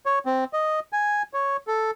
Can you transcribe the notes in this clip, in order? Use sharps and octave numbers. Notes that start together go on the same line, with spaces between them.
C#5
C4
D#5
G#5
C#5
A4